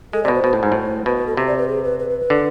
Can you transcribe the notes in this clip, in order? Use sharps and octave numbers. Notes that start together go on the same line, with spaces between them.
G#3 A4
C3 D5
B2
C5
B2
A2
G#2
A2
B2 B4
B4
A4
C3 C5
D5
B4
G#4
B4
B4
B4
B4
D3